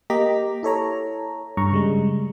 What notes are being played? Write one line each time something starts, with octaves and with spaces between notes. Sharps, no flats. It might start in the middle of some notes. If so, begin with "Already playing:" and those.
A#3 G4 D#5 A#5 D6 B6
E4 A4 C#5 A#5
G2 A#5 C#6
C#3 G3 G#3